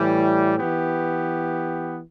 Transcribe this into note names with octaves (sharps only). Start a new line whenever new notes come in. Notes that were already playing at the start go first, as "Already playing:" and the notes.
Already playing: A2 E3 G3
E3 B3 G4